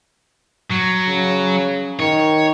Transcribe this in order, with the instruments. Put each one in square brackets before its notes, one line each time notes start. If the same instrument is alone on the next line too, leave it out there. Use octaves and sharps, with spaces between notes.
[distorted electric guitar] F#3
[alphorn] C#3
[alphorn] D#3 [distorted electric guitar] C#5